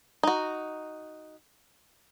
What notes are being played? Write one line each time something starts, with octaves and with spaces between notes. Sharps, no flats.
D#4 F#4